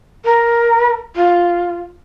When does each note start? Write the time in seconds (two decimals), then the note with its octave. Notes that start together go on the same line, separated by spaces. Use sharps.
0.25 A#4
1.16 F4